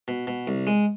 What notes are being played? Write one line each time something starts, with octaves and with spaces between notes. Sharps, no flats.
B2
B2
C2
G#3